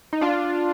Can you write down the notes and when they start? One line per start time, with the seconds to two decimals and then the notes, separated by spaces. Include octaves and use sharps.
0.13 D#4
0.21 D4 F4